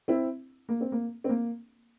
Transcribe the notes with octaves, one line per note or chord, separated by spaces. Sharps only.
C4 E4
A#3
C4
A#3
C4
A#3